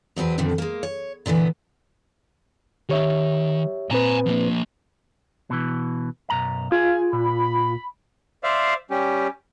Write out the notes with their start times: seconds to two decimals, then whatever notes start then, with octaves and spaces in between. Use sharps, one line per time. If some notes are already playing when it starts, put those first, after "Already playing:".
0.16 E2 F#3 C4 B4
0.38 F2 A#2 D3 D#3
0.58 G#3 A#3
0.83 C#5
1.26 A#2 D3 E3 B3
2.89 D#3 G4 C#5 E5
3.91 A#2 C4 B4 G#5 A#5
4.26 F3 A#3
5.50 B2 E3
6.30 B1 F#2 A#5
6.72 F4 G#4 F5 G#5
7.13 A#2 B5
8.44 C5 D5 E5 F5
8.90 G3 C#4 G4